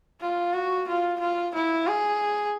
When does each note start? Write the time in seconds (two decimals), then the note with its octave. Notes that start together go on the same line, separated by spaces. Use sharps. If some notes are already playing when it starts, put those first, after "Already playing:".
0.20 F4
0.53 F#4
0.88 F4
1.20 F4
1.54 E4
1.88 G#4